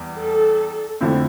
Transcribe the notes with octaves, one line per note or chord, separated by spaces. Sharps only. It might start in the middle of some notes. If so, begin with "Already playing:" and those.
Already playing: E2 G3
A4
F2 D3 A3 C4 E4